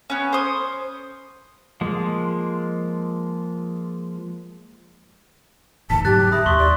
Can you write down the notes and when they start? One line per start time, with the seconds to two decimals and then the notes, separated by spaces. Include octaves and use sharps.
0.10 B3 C#4
0.33 C5 D#6
1.81 F3 G#3 A#3
5.90 F1 A2 D#3 A5 B6
6.05 G#2 C3 F#3 G4 F#6 A6
6.32 E5 B5 D#6 A#6
6.46 D#2 C6 C#6 G7
6.59 D5